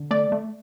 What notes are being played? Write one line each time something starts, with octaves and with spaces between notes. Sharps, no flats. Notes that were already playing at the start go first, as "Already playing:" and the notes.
Already playing: D3
A3 D5
A3